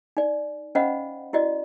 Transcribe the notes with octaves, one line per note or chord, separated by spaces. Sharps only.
D#4 D5
C#4 C5 D#5 F5 F#5 B5
E4 F#4 D5 D#5